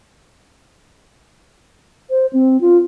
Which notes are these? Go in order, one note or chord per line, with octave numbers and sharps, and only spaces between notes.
C5
C4
F4